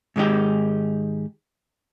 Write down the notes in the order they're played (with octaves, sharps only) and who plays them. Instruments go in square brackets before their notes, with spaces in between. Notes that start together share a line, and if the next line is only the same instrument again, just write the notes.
[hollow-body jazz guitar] G#2 D#3 G#3 D#4 G4